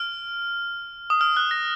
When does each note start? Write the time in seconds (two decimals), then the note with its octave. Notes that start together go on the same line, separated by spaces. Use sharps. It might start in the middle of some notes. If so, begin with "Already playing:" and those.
Already playing: F6
1.10 D#6
1.21 F6
1.37 F#6
1.51 A#6